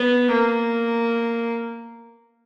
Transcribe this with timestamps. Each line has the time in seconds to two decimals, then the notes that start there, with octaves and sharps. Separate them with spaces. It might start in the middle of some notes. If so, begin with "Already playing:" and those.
Already playing: B3
0.30 A#3